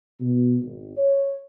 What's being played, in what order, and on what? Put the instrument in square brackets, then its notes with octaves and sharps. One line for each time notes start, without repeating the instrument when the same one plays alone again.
[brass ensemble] B2
G#1
C#5